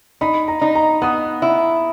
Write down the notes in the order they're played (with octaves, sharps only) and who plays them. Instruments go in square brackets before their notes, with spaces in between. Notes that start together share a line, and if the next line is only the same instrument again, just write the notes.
[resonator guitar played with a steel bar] D#4 [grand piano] B5
[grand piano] A#5
[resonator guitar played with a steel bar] D#4
[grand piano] A#5
[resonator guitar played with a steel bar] B3 [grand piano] D#6
[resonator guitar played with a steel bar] E4